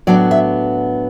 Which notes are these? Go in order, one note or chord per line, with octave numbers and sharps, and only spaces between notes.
A2 F#3 B3 D4 D5
E5